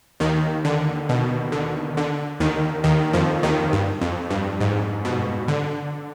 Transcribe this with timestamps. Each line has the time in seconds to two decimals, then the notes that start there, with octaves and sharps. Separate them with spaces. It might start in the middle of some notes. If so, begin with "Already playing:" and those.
0.20 D#2 D#3
0.65 D3
1.09 B2
1.52 D3
1.97 D3
2.40 D#2 D#3
2.84 D#2 D#3
3.13 F2 F3
3.43 D#2 D#3
3.73 G2
4.01 F2
4.30 G2
4.61 G#2
5.05 B2
5.48 D3